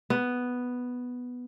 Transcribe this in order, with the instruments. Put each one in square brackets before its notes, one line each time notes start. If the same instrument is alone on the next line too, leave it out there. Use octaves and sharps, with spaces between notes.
[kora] B3